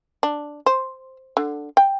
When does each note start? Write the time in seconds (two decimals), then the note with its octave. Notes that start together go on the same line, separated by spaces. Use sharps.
0.23 D4
0.66 C5
1.37 D3
1.77 G5